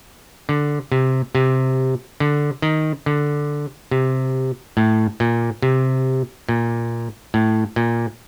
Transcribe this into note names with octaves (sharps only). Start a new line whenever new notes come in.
D3
C3
C3
D3
D#3
D3
C3
A2
A#2
C3
A#2
A2
A#2